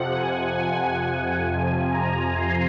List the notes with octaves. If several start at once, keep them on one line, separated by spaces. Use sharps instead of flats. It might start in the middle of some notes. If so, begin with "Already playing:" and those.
Already playing: F2 C3 F3 F#5
G#5
G#5
F2 C3 F3
A#5
C6